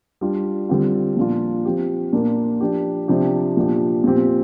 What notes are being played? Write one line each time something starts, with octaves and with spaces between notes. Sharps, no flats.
G3 D4 F4
D3 G3 C4 F4
A#2 F3 D4 F4
F3 C4 G4
A#2 A#3 D4 F4
F3 D4 G4
C3 F3 D4 G4
A#2 F3 D4 G4
A#2 F3 C4 G4